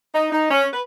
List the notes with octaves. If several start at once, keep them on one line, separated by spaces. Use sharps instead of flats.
D#4
D#4
C#4
B4